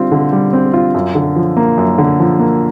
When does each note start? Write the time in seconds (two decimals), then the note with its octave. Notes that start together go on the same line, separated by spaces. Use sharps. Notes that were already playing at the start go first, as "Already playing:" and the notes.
Already playing: D3 G3 C4 F4
0.12 D3
0.33 G3
0.53 C4
0.73 F4
0.95 F#2
1.15 D3
1.36 F3
1.57 A#3
1.78 F#2
1.98 D3
2.20 F3
2.39 A#3